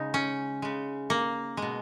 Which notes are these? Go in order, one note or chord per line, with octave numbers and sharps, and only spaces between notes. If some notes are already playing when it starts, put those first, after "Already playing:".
Already playing: C#3 G#3 D#4
C#4
C#3 G#3
A#3
B2 G#3